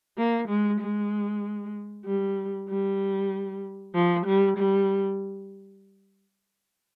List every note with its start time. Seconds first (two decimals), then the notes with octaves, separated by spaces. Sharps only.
0.18 A#3
0.48 G#3
0.81 G#3
2.06 G3
2.69 G3
3.95 F3
4.26 G3
4.57 G3